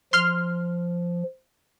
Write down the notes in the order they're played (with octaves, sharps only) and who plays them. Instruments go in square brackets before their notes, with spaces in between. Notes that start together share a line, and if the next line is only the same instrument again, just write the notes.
[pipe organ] F3 [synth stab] C6 F6